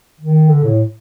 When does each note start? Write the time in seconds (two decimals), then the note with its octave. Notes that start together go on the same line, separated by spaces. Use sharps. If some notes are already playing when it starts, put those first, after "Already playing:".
0.21 D#3
0.50 D3
0.64 A2